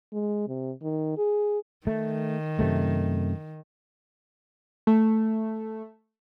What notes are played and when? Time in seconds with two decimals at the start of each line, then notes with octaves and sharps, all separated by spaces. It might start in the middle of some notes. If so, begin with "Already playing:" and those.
0.13 G#3
0.48 C3
0.82 D#3
1.17 G#4
1.87 D#3 A3
2.59 F#2 C3 A3
4.87 A3